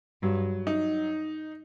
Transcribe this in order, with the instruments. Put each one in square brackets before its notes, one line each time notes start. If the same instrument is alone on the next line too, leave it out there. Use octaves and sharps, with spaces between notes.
[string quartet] G2 [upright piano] F#3
[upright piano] D#4